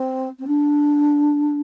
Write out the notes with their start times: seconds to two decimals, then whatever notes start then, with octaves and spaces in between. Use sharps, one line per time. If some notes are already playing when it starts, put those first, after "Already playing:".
Already playing: C4
0.39 C4
0.47 D4